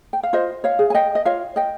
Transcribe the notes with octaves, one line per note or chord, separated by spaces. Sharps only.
G5
F5
F4 C5 D#5
C#5 F5
G#4
G#5
D#5 G5
D#5
F4 C#5 F5
D#5 G5